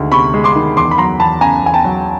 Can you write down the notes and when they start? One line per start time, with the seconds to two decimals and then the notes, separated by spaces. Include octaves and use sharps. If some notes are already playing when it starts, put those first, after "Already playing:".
Already playing: D2 D#3 G#3
0.12 C3 B5 C#6
0.34 G#3
0.44 C6 D6
0.56 D#3
0.77 E2 C6 D6
0.91 B5
0.98 F#3 A#5 C6
1.20 E2 A5 B5
1.41 C#3 G#5 A#5
1.63 E2 G#5
1.74 G5 A5
1.85 F#3